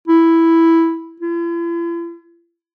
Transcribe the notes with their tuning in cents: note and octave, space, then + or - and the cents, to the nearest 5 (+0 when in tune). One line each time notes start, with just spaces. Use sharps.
E4 +0
E4 +45